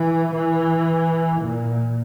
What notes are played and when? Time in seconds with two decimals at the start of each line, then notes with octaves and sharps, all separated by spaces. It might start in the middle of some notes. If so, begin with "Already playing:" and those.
Already playing: E3
0.33 E3
1.42 A#2